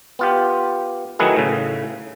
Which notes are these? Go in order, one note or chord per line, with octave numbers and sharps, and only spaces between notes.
B3 F4 G4
D#3 F#3 A3 E4 G#4 B4
A2 C#3